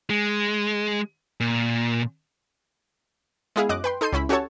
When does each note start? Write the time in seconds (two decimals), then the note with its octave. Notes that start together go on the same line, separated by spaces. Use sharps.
0.10 G#3
1.40 A#2
3.56 G#3 B3 E4 G#4 F5
3.69 F#2 D#5 D6 F#6
3.84 B4 G5 C6
4.01 D#4 A4 C6 G6 C7 D#7
4.12 C#2 C#4 E4 B5
4.29 C#4 F#4 G4 A4 C#5 A5